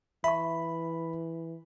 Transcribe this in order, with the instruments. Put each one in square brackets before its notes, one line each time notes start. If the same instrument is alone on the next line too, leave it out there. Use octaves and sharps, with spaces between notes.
[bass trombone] E3 [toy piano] E5 A5 C#6 [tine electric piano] B5